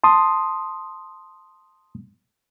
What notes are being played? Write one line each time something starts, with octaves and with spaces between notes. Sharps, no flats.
A5 C6 D#6